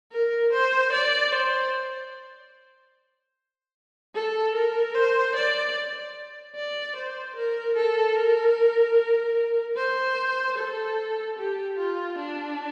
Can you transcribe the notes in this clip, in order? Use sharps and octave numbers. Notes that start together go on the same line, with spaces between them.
A#4
C5
D5
C5
A4
A#4
C5
D5
D5
C5
A#4
A4
A#4
C5
A4
G4
F4
D4